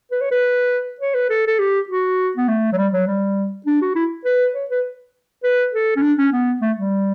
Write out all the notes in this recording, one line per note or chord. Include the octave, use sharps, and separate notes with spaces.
B4
C#5
B4
C#5
B4
A4
A4
G4
F#4
B3
A3
F#3
G3
F#3
G3
D4
F#4
E4
B4
C#5
B4
B4
A4
C#4
D4
C#4
B3
A3
G3